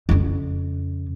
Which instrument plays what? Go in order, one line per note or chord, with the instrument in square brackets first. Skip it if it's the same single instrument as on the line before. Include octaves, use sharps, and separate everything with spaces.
[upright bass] F2 C#3